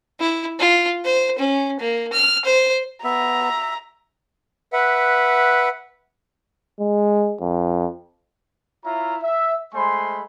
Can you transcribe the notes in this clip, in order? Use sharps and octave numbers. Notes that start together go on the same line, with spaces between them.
E4
F4
C5
C#4
A#3
F6
C5
B3 E5 A#5
B4 E5 F#5
G#3
F2
E4 F4 C#5 E5 F5 A#5
E5
G#3 A3 C5 G#5 B5 C6